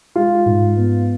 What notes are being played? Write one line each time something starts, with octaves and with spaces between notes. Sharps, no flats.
G#3 F4
G#2
B3